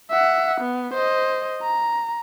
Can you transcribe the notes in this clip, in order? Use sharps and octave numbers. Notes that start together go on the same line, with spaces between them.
E5 F#5
B3
C5 D#5
A#5